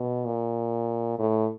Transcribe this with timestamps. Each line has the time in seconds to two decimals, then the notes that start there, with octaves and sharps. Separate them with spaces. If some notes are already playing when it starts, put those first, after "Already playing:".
Already playing: B2
0.25 A#2
1.19 A2